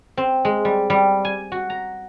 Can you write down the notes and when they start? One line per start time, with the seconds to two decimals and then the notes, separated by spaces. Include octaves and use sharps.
0.17 C4
0.45 G#3
0.65 G3
0.90 G3
1.25 G#5
1.52 F#4
1.70 A#5